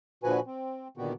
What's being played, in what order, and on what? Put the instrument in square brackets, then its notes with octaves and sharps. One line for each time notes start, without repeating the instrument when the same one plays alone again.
[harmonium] A#2 D3 F3 F#4 B4 G#5
C4
A#2 D3 D#3 B3 F#4 G4